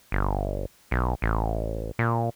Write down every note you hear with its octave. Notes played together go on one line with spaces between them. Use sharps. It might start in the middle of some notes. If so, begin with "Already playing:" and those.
G1
B1
A1
A#2